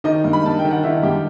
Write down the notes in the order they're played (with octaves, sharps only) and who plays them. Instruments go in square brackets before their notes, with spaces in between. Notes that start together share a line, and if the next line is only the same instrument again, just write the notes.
[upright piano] D#3 D#4 D#5
G2
B5
G2 A5
G5
D#3
F#5
D#3 E4 E5
G2 G4 G5